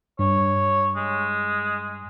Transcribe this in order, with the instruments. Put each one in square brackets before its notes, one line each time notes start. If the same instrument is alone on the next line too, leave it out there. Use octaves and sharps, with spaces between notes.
[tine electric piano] G2 [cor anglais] C#5
[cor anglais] G#3